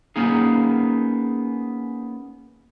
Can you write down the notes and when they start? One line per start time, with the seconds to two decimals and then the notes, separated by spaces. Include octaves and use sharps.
0.16 A#3 B3 C#4 D#4 G#4